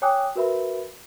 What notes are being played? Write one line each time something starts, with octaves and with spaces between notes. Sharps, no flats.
C#5 G5 G#5 D6 D#6 F#6
F#4 A#4 B4 E5 B5